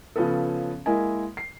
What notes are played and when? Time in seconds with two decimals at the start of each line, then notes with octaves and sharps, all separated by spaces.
0.16 C#3 F3 B3 C#4 A4
0.86 G#3 A#3 E4 D#5 G#5
1.37 C7